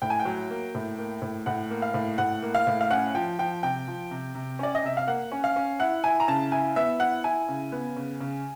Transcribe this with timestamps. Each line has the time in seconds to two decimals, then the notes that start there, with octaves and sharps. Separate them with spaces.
0.02 A2 G5
0.10 G#5
0.20 G5
0.25 F#3
0.50 A#3
0.75 A2
0.98 A#3
1.22 A2
1.46 A2 F#5
1.70 A#3
1.82 F5
1.94 A2
2.18 A2 F#5
2.42 A#3
2.55 F5
2.67 A2
2.81 F5
2.90 C#4 F#5
3.15 F3 G5
3.39 F3 G5
3.63 C3 G5
3.88 F3
4.11 C3
4.35 C3
4.59 C#4 D5
4.75 D#5
4.83 C3 E5
4.97 F5
5.07 A#3 F#5
5.32 C#4
5.44 F5
5.56 C#4
5.80 E4 F#5
6.04 E4 G#5
6.20 A#5
6.28 C#3 A5
6.52 E4 G#5
6.76 B3 E5
7.00 E4 F#5
7.24 E4 G#5
7.48 C#3
7.72 B3
7.97 C#3
8.21 C#3